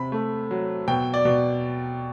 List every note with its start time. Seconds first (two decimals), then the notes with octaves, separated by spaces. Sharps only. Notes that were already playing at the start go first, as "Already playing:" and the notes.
Already playing: C3 C4 B5
0.12 A3
0.51 F#3
0.88 B2 G5
1.14 D5
1.25 B2